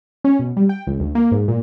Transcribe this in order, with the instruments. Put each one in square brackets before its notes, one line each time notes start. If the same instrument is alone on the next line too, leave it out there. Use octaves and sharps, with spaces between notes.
[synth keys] C#4
B2
G3
G5
C#2
D2
A#3
G#2
A#2